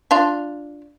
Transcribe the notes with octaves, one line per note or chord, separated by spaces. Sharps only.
D4 F4